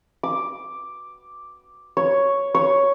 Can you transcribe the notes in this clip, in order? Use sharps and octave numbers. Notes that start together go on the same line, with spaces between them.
D6
C#5
C#5